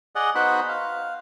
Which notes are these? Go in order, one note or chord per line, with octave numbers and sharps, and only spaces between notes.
G#4 D5 D#5 F#5
B3 D#4 F#4 C5 B5 F#6
F5